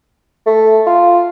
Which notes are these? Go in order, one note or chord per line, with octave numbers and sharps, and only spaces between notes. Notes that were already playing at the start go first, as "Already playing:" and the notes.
A3
F4